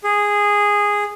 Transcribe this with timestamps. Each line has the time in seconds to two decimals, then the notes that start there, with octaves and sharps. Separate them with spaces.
0.04 G#4